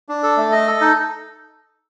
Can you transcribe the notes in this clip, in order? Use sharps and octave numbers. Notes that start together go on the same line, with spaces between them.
D4
A4
A3
D#5
A4
D#4